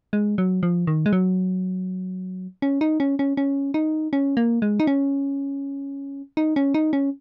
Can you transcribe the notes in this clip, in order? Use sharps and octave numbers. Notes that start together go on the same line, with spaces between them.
G#3
F#3
F3
D#3
G#3
F#3
C#4
D#4
C#4
C#4
C#4
D#4
C#4
A#3
G#3
D#4
C#4
D#4
C#4
D#4
C#4